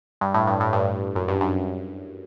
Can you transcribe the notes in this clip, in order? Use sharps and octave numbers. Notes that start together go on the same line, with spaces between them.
G2
A2
G2
A2
G2
F#2
G2
F#2